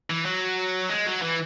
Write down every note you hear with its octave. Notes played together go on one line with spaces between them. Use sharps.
E3
F#3
G#3
F#3
E3